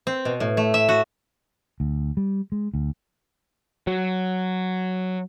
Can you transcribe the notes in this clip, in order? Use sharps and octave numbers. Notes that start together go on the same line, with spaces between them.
C4
B2
A2
A3
E5
F#4
D2
G3
G#3
D2
F#3